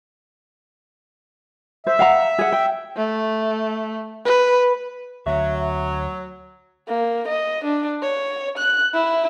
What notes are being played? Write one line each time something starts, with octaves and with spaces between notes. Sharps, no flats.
C5 E5
F5 F#5 A#5
G#4 F#5
G5
A3
B4
D2 F#3 E5
A#3
D#5
D4
C#5
F#6
E4